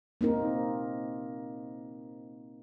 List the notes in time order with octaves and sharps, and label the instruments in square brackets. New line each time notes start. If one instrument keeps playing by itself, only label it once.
[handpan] A#3 C4 D#4 A#4